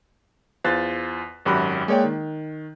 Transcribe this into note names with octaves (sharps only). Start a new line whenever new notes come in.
E2 F4 C5 F#6 A6
G#1 F#2 F#4 G4 B5 F#6
G#3 A#3 C#5 D5 G5
D#3